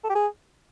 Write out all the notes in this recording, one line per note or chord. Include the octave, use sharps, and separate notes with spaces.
A4
G4
G#4